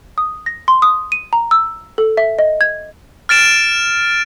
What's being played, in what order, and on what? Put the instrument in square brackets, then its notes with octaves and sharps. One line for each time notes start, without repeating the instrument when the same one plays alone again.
[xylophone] D#6
A#6
C6
D#6
D#7
A#5
E6
A4
E5
D#5
G#6
[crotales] F6 A6 D7 E7